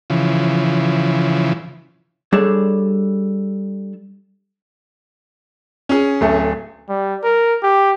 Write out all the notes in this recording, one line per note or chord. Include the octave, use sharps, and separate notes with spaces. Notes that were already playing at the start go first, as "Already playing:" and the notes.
C#3 E3 F3
G3 D4 G#4 A4 C#5
C#4 G#4
D1 A3
G3
A#4
G4